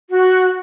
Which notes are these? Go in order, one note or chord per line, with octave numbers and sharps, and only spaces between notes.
F#4